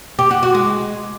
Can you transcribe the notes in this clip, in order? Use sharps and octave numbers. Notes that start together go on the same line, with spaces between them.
G4
F#4
F#4
G#3